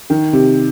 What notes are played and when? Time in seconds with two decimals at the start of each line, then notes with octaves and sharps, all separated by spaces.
0.10 D#3
0.33 C3